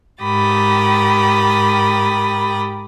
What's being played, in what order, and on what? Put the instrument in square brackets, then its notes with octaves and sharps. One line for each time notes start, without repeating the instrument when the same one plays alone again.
[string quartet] G#2 G4 A#4 B5 D#6 A6